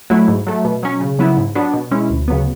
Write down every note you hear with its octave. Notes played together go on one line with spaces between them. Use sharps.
F#3 A3 E4
G#2
F#3 A3
B2
F#3 C#4
C#3
F#3 B3 E4
G#2
F#3 B3 D4
B2
G#3 C#4 E4
D2
C#3 F#3 B3